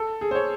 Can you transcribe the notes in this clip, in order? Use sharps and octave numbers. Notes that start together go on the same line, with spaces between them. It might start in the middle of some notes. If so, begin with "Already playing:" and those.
Already playing: A4
G#4
C5
C#5